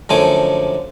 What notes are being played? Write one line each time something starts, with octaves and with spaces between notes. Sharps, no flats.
F#2 D3 F3 A3 G#5 D6